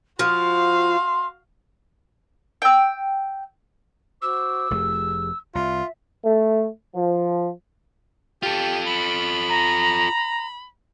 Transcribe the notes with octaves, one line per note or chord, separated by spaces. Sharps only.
F3 F#4 F5 C6
G5 E6
F#4 C5 D6 E6
F1 F2 A3 G4 G#4
C2 F4 E5
A3
F3
F4 G4 A4
B5
A#5